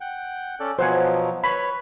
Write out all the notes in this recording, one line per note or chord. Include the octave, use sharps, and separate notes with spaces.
F#5 G5
C#4 A4 D5
B2 F3 F#3 C5 F#5 G#5
B4 C#5 B5